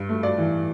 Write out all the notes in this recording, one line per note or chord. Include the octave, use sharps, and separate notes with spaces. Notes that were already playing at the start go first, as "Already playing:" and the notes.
Already playing: G2
A3
D5
E3